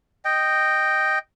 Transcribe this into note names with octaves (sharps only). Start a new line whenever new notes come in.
D#5 G5